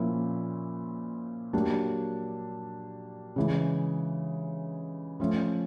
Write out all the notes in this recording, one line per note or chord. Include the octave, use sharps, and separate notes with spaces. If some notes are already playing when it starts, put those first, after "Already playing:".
Already playing: A#2 F3 A#3 C#4 E4
F#3 A#3 D4 G4
C#3 E3 G#3
F3 A3 C#4